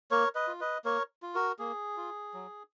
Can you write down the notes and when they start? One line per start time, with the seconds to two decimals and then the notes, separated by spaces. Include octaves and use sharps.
0.11 A#3 A#4 C#5
0.35 B4 D#5
0.48 F4
0.60 B4 D#5
0.85 A#3 A#4 C#5
1.23 F4
1.35 F#4 A#4
1.59 A#3 G#4
1.97 F4
2.34 F#3